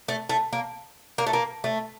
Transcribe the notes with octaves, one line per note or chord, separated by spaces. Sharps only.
A3
A3
A#3
A#3
A3
A#3
A3